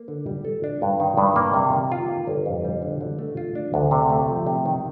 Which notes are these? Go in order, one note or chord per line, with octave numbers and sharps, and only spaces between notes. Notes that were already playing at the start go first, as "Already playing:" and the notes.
Already playing: A#3
D3
G3
A4
D4
G2
D#3
G2
A#3
C3
D#3
F4
A#3
G1
F2
G3
D3
D3
A3
F4
D4
D2
C3
A3
F3
C3
D#3